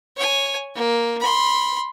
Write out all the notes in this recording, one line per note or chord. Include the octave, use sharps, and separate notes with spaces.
C#5 G#5
A#3
B5 C6